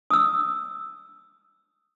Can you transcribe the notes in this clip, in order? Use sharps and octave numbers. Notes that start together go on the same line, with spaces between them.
D#6 E6